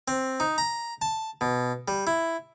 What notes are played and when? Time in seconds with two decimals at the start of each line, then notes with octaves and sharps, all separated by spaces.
0.08 C4
0.40 D#4
0.58 A#5
1.02 A5
1.41 B2
1.88 G3
2.07 E4